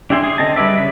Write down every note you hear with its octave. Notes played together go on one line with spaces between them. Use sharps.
D4 G4 E5 G#5 C6
G#4
D3 C4 D#5 A5
G3 G#3 B4 D5 E5
C#3 B5